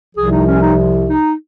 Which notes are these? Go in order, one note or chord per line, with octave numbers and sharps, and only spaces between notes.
C2 C3 F3 G#4
D#4
C#4
D#4
D#4